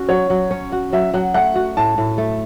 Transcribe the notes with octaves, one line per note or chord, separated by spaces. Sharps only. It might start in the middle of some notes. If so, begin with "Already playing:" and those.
Already playing: C#4 F#4
F#3 C#5
F#3
C#4
F#4
F#3 E5
F#3 F#5
A3 F#5
F#4
A2 A5
A2
A3